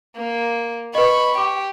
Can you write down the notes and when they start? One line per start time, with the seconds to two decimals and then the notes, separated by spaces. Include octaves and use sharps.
0.16 A#3
0.95 B4 D#5 B5 C#6
1.38 G4 D6